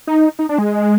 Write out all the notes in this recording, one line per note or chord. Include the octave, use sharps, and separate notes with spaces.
D#4
D#4
D4
G#3